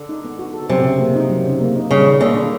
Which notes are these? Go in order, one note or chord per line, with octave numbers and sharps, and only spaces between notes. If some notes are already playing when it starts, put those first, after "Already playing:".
Already playing: D3
D#4
B3
F#4
A4
C3 F#3
C#3
A#3
D#4
F#3
C#3
A#3
D#4
C#3 G3
D#3
D3 A#3
D4